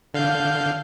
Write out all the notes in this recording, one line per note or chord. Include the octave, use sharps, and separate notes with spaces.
D3 F5 G6